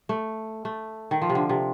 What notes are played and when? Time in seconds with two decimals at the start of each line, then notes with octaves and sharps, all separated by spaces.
0.09 A3
0.65 A3
1.11 D#3
1.22 F3
1.30 C3
1.35 D3
1.49 C3